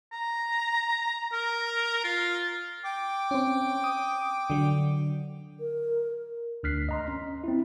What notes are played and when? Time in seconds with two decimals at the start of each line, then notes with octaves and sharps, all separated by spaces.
0.12 A#5
1.32 A#4
2.04 F4
2.84 G5 D6
3.31 C4 C#4
3.84 D#6
4.50 D3 F#3
5.60 A#4
6.63 D2 D4 F6 F#6 B6 C7
6.89 D#5 A#5 C6
7.08 C#4
7.44 C4 E4